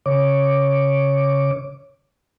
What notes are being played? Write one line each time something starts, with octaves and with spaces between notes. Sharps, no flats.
C#3 C#5 D6